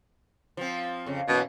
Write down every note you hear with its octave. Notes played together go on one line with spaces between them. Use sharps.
F3 C4
F2 C#3
F#2 B2 E3 A#3